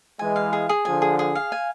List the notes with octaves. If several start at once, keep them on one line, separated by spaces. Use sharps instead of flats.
E3 G#3 G#5
F5
G#4
G#4
D3 F3 G#5
G#4
G#4
F5
G#5